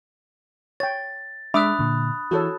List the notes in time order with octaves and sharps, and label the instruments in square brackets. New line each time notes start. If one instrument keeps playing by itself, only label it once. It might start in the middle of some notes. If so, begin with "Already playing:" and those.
[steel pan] C#5 G5 [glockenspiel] A6
[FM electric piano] G#3 [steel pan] D4 E5 D6 [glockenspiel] B5 D#6 F#6
[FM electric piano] A#2 D3
[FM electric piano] E3 E4 G#4 [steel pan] F#4 A4 C#5